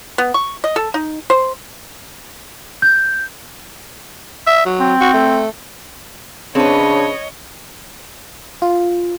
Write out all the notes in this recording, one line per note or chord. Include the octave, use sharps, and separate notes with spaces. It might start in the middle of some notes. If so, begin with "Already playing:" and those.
B3
C#6
D#5
A4
D#4
C5
G6
E5
F#3
C4
F#4
A3
C#3 C4 D4 B4 C#5 D#5
F4